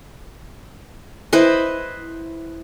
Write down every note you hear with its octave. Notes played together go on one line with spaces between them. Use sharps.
E4 B4 C5 D#5